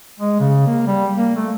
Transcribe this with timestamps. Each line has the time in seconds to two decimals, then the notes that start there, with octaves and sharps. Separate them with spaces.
0.20 G#3
0.40 C#3
0.67 A#3
0.87 G3
1.17 A#3
1.36 A3